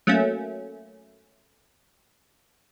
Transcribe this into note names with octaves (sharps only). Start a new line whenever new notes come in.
F#3 A3 A#3 C#4